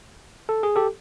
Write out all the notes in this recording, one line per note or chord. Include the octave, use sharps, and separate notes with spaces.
A4
G#4
G4 A4